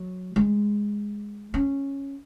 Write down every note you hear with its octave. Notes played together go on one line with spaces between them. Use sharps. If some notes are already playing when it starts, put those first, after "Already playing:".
Already playing: F#3
G#3
C#4